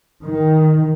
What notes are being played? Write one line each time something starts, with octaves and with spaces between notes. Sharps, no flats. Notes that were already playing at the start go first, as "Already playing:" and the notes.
D#3